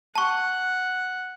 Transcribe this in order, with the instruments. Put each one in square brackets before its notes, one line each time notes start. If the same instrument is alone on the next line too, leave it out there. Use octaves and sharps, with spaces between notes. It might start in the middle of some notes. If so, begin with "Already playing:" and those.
[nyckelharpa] F#5 [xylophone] A5 C#6